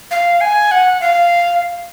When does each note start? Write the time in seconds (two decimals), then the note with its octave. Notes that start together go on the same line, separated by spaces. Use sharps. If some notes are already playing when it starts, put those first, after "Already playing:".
0.11 F5
0.41 G#5
0.71 F#5
1.01 F5